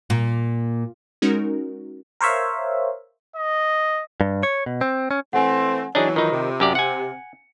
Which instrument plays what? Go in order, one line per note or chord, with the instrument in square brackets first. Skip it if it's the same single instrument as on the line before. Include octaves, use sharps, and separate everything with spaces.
[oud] A#2
[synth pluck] G#3 C#4 D#4 F#4 A#4
[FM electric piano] A#4 C5 C#5 E5 F5
[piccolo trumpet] D#5
[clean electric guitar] G2
C#5
B2
C4
C#4
[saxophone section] E3 A3 C4 [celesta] F#5 G#5
[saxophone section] E3 F#3 [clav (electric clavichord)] D4 D#4 G#4 [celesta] C#5
[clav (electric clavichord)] D#3 D#4 [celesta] F4 B5
[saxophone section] C3
[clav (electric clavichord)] F#2 G4 D5
[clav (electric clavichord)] F#5 G#5 [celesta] C#7